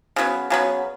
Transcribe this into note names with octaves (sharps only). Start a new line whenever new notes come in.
C#3 F#3 B3
C#3 F#3 B3